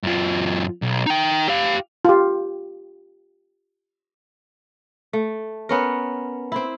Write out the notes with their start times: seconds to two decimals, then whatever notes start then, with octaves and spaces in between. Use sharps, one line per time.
0.03 F#2 F4
0.82 B1
1.06 D#4 G5
1.48 G4 F5
2.05 F4 G4
5.13 A3
5.69 B3 C#4 A#4
6.52 C4 E4